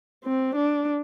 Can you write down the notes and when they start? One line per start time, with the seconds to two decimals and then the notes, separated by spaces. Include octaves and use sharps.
0.25 C4
0.56 D4